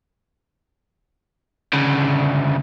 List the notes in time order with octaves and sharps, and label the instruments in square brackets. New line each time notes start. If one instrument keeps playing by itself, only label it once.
[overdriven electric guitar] D2 C#3